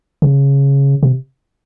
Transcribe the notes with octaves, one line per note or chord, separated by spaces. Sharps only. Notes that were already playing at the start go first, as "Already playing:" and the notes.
C#3
C3